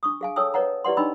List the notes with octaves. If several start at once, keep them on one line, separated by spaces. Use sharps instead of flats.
D4 C#6 D#6
G#4 F5 G#5
A4 C#5 G5 A5 D#6 E6
B4 C#5 D#5 F#5 A#5
E4 G4 B4 D5 F#5 C6
D4 D#4 D#5 G5 B5 E6